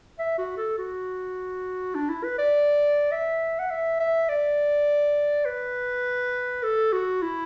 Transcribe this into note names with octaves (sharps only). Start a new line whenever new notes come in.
E5
F#4
A4
F#4
D4
E4
B4
D5
E5
F#5
E5
E5
D5
B4
A4
F#4
E4